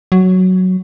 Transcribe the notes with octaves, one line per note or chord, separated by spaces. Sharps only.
F#3